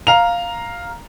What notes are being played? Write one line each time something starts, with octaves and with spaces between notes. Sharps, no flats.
F5 A#5 F7